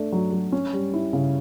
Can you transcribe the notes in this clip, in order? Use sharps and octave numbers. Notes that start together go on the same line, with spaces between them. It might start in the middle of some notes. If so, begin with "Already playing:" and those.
Already playing: A3 D4
F#3
F#3
C#4
G3
E4
C#3